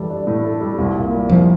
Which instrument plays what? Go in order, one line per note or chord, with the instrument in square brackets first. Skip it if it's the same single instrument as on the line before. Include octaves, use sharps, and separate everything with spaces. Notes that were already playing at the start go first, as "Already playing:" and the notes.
Already playing: [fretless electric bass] E3 [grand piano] G3 A4
[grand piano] D4
A2
A4
G3
C2
A#2
G3
[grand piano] C2 [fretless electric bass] F3